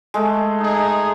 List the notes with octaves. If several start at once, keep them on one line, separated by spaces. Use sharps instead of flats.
G#3 A3
D#4 G#4